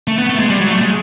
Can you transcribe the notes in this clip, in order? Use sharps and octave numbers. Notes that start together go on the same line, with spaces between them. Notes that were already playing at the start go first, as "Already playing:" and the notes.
A3
B3
A3
G#3
G3
F#3
A3
G#3